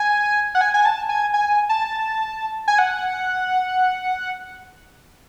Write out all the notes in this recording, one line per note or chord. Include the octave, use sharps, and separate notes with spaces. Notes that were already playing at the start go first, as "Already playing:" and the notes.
Already playing: G#5
F#5
G#5
G#5
A5
G#5
G#5
A5
G#5
F#5